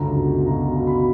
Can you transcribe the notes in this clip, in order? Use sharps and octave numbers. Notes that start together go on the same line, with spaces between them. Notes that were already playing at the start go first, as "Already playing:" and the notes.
Already playing: C#2 F#2 D3 A#5
B2
B2 A#5
A#5
B2
B5